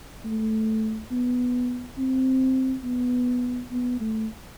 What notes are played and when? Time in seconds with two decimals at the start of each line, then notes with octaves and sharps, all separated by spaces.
0.25 A3
1.11 B3
1.98 C4
2.84 B3
3.71 B3
4.00 A3